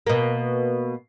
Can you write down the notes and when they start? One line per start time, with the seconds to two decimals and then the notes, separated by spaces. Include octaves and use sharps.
0.07 B2 A#3